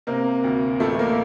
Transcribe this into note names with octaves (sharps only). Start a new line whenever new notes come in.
C3 A#3 A#4
D2
A1 A3 A4
A#3 A#4